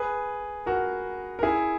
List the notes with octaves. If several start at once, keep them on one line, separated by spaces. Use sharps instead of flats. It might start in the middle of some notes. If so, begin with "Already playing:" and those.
Already playing: G#4 B4
F#4 A#4
A#4
E4 G#4